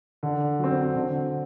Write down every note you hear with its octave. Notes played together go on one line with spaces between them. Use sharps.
D3
F#3 C4
D3